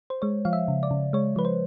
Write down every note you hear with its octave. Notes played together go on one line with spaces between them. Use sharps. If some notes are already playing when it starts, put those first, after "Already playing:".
C5
G#3 C#5
F3 F5
E5
C#3
D5
C#3
G#3 C#5
F3 B4
C5